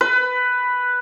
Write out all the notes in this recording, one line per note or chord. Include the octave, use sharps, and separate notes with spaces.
B4